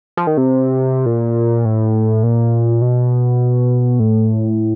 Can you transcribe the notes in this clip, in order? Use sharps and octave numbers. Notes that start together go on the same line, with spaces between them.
F3
D#3
C3
A#2
A2
A#2
B2
A2